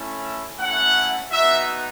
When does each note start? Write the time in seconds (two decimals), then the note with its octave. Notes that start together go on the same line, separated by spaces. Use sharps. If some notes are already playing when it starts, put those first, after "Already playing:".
Already playing: A3 C#4 E4
0.59 A3 C#4 E4 F#5
1.30 B3 D#4 F#4 E5